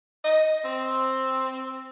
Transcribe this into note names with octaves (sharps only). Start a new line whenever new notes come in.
D#5
C4